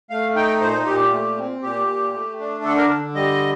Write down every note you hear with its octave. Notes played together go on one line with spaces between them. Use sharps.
A3 F5
D#4 G5
A#2 C5
A#2 G4
A3
C4
A#2 G4
A#2
A3
D4
D3 A4
A#4
D3
G3 D#5